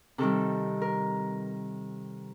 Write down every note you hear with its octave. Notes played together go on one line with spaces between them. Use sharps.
C3 D#3 G3 A4
A#4